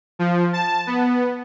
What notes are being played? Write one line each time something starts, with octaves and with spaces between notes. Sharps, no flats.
F3
A5
B3